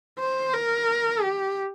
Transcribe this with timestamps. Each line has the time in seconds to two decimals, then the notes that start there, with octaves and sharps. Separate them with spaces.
0.19 C5
0.54 A#4
1.22 G4